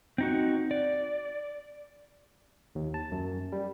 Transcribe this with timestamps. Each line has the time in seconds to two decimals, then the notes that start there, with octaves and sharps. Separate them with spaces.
0.18 C4 D#4 F#4
0.71 D5
2.75 D#2
2.94 A5
3.12 F#2
3.52 G3